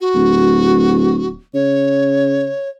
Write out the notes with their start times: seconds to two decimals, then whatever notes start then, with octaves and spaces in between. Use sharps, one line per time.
0.01 F#4
0.15 D1
1.54 C#3 C#5